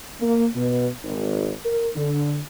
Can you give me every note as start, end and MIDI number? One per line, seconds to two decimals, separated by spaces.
0.20 0.46 58
0.55 0.87 47
1.04 1.50 32
1.65 1.87 70
1.95 2.38 50